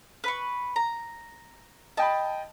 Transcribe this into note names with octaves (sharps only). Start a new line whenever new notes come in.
B4 B5 C#6
A#5
D#5 G5 A5 B5